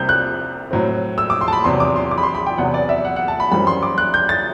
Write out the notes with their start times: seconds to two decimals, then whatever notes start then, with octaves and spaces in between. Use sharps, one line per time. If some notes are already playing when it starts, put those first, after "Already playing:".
Already playing: C2 C3 G3 C4 G6
0.09 F#6
0.71 A2 F#3 C4
1.18 E6
1.30 D6
1.41 C6
1.48 A5
1.53 B5
1.64 E2 C3 F#3 C6
1.80 D6
1.96 C6
2.11 D6
2.18 B5
2.23 C6
2.35 B5
2.46 G5
2.58 E2 C3 F#3 B3 F#5
2.74 D5
2.89 E5
3.05 F#5
3.16 F#5
3.28 A5
3.40 B5
3.52 F#2 E3 G3 C4 B5
3.67 C6
3.83 D6
3.98 F#6
4.14 G6
4.29 A6